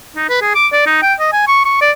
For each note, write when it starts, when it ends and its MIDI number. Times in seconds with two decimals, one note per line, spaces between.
0.16 0.28 63
0.29 0.38 71
0.41 0.52 68
0.55 0.67 86
0.72 0.83 74
0.86 0.99 63
1.02 1.13 79
1.20 1.30 75
1.33 1.46 80
1.48 1.63 85
1.65 1.80 85
1.81 1.91 74